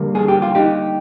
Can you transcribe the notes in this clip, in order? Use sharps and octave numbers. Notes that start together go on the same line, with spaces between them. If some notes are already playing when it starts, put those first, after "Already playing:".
Already playing: D3 G3 A#3
G#4
G4
F4
D#4 G4